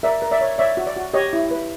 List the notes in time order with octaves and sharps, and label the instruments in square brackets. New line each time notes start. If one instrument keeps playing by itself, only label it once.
[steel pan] A#4 D5 E5
A#4
D5 E5
C#5
C#5 D5 E5
F#4
D5
F#4
G4 C#5 D#5
E4
B4